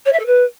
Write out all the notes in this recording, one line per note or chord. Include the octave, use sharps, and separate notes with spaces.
C#5
E5
A4
B4